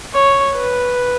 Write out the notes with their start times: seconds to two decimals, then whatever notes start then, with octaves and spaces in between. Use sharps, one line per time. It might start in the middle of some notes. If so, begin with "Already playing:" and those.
0.14 C#5
0.55 B4